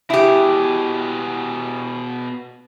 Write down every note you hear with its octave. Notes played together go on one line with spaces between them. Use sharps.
B2 E4 G4 G#4